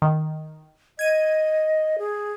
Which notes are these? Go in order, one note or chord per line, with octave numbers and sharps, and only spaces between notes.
D#3
D#5 G#6 D#7
G#4